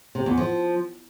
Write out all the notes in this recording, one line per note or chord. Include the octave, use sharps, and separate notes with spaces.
C3
E2
F3